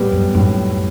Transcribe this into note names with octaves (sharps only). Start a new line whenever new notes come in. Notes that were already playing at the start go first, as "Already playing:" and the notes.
Already playing: A2 G3 B3
F#2
F#2 A2